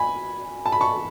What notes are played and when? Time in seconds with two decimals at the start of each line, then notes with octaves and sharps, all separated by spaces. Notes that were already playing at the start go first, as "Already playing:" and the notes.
Already playing: G#5 B5
0.66 A5
0.72 B5
0.81 A5 C#6